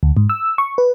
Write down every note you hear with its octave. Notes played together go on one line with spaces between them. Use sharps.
D2
G#2
E6
C#6
B4